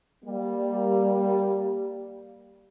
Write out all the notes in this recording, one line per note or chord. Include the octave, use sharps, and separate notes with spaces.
G3 A#3